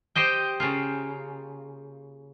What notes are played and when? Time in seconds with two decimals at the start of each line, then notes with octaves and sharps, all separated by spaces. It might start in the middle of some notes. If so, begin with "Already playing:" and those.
0.15 G4 C5 D#5 G5
0.60 C#3 A#3 F4